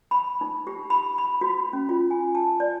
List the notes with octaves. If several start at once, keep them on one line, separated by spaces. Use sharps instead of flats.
B5
D#4
G4
B5
B5
F#4
C#4
F4
G#5
A5
D5